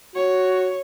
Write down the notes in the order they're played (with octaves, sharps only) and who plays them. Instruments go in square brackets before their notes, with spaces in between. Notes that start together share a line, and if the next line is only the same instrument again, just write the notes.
[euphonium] F#4 [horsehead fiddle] C#5